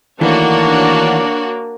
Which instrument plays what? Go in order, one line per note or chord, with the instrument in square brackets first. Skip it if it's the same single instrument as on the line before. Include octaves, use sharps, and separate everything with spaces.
[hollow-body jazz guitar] D#3 E3 A3 [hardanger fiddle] A#3 [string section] D4 F#4 C#5